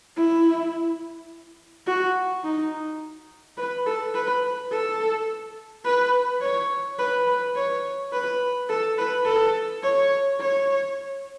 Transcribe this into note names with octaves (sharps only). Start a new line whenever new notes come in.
E4
F#4
D#4
B4
A4
B4
A4
B4
C#5
B4
B4
C#5
B4
A4
B4
A4
C#5
C#5